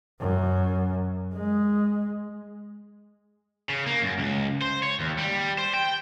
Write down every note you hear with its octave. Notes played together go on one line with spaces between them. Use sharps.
F#2
G#3
C#3
A#3
F#2
C#2
C5
C#5
D#2
G3
C5
G5